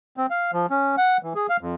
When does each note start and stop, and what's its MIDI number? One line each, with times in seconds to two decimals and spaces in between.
0.17 0.26 60
0.30 0.51 77
0.53 0.66 53
0.70 0.96 61
0.97 1.17 78
1.23 1.33 52
1.35 1.47 68
1.49 1.57 77
1.61 1.75 41